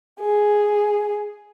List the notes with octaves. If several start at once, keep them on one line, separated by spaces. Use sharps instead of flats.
G#4